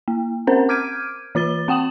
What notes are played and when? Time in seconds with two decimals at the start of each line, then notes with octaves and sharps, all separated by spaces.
0.08 A#3
0.47 C4 C#4 A#4 C5
0.69 D6 F6 G6 G#6 D7 D#7
1.35 E3 F4 A6 G7
1.68 C4 F#5 G5 D#6 E7 F#7